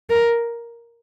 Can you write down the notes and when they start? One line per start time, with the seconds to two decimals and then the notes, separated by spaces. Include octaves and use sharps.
0.10 A#4